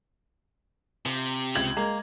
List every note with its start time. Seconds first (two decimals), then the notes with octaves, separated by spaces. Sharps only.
1.06 C3 F3
1.55 C#2 G#6 F#7
1.77 G#3 A#3